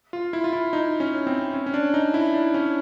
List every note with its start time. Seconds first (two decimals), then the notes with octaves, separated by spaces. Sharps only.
0.13 F4
0.33 E4
0.44 F4
0.53 E4
0.73 D#4
1.00 C#4
1.27 C4
1.54 C#4
1.66 C#4
1.74 D4
1.94 D#4
2.14 E4
2.34 D4
2.54 C#4